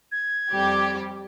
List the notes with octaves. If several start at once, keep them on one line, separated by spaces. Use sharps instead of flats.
G#6
F2 G3 G4